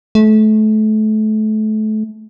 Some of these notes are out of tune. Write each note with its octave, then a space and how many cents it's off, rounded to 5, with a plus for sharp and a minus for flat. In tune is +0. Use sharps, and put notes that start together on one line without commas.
A3 -30